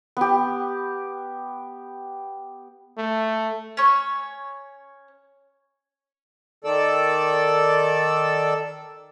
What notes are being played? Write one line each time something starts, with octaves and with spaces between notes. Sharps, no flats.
B3 G4
A3
C#4 C#5
D#3 A4 D5 E6